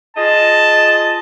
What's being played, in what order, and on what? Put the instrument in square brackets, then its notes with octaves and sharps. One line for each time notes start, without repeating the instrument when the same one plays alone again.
[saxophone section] F4 G#4 D#5 [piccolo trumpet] A5